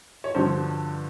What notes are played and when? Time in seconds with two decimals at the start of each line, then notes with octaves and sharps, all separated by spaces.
0.24 C#5
0.34 G2 D3 F3 C5